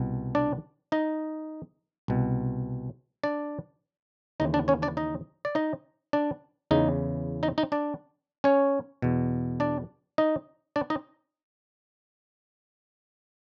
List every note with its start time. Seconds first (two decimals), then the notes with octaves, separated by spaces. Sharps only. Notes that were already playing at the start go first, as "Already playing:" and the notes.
Already playing: C2 B2
0.35 D4 D5
0.92 D#4 D#5
2.08 C2 B2
3.23 D4 D5
4.40 D#2 C#3 E3 D#4 D#5
4.54 D4 D5
4.68 C#4 C#5
4.82 D4 D5
4.97 D#4 D#5
5.45 D5
5.55 D#4 D#5
6.13 D4 D5
6.71 E2 C#3 E3 D#4 D#5
7.43 D#4 D#5
7.58 D#4 D#5
7.72 D4 D5
8.44 C#4 C#5
9.02 E2 B2
9.60 D4 D5
10.18 D#4 D#5
10.76 D4 D5
10.90 D#4 D#5